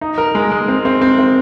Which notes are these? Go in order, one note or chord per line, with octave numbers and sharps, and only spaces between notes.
D#4
A#4
G#3
G#3
C4
C4
C4
C4